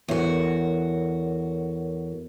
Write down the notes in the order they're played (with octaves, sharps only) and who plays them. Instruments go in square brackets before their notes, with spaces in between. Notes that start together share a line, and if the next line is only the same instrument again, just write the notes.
[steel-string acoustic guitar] E2 F#4 [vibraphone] A4 A#4 C#5